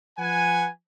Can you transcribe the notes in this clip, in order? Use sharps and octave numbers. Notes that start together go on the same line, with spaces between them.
F3 B4 F#5 G#5